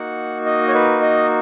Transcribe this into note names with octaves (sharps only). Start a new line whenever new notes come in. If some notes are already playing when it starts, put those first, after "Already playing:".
Already playing: A#3 D#4 F#4 F#5
D#5
C#5
B4
D#5